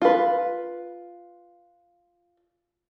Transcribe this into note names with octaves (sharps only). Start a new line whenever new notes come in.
F4 B4